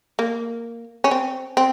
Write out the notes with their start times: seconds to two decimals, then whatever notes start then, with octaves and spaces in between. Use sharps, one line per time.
0.19 A#3
1.04 C#4
1.11 C4
1.57 C4